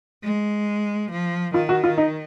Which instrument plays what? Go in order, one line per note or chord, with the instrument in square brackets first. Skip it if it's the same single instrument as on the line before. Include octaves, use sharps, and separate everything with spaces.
[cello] G#3
F3
[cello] D#3 [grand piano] F4
[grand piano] F#4
F4
D#4